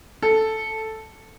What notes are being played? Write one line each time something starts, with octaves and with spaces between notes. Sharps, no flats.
A4